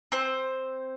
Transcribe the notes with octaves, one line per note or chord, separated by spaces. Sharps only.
C4 C5